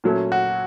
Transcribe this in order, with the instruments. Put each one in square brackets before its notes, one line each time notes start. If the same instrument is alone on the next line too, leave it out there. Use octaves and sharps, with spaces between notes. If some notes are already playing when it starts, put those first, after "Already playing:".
[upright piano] A#2 F#3 A3 C#4
[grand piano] F#4